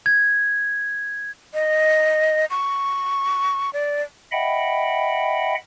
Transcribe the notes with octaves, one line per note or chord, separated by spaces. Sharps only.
G#6
D#5
C#6
D5
D#5 E5 F#5 G5 B5